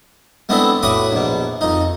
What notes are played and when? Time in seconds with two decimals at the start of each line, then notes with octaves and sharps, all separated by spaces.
0.49 G#3 B3 C4 D4 E4 A4
0.83 A2 F#4 B5 D6 D#6
1.12 A#1 B2
1.61 F2 D#4